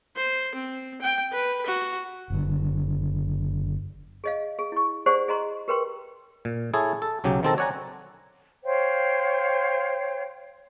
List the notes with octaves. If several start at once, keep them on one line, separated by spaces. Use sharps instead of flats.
C5
C4
G5
B4
F#4
F#1 D3
G#4 D#5 F5
G#4
E4 C#6
G4 G#4 C5 D5 F#5 C#6
G#4 D#5 A#5 C6
G4 A#4 B4 G5 C6
A#2
E4 G#4 A4 C#5
A4
B1 C#3 F#3 G4
D#3 C4 A4 A#5
C#5 D5 F#5 G#5 A#5
C5 C#5 F5 G5